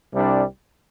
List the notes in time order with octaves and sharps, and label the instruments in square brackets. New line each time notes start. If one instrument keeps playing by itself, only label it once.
[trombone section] C2 C3 G3 D4